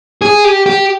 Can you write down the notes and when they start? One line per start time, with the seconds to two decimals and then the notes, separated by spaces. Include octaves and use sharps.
0.22 G#4
0.44 G4
0.66 G4